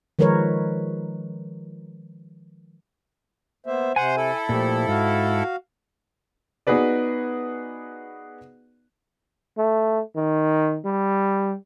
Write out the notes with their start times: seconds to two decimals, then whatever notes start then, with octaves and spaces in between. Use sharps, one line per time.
0.19 D#3 F3 G#3 A#4 B4 C#5
3.66 A#3 B3 C5 E5
3.96 C3 C5 F#5 G#5
4.17 E4 A4
4.49 A#2 F3 A3 G4
4.88 G#2 F#4 F5
6.67 B3 D#4 F#4 G#4 B4 D5
9.58 A3
10.16 D#3
10.85 G3